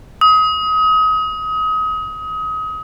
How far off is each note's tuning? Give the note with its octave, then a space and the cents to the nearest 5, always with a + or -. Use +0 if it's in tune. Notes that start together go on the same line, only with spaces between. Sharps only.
D#6 +30